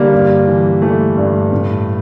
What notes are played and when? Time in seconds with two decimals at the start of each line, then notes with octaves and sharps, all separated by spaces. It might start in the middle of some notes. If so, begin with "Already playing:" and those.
Already playing: D3 G3 A#3
0.13 G2
0.48 E3
0.82 E3 A3
1.17 G2
1.52 A2